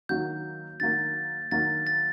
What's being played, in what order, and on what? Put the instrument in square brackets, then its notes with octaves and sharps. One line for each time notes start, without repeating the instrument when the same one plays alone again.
[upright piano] D#3 F#3 A#3 F#4 [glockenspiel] G6
[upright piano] D#3 F#3 A#3 F#4 [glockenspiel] A6
[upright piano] D#3 F#3 A#3 F#4 [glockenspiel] A6
[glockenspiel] A6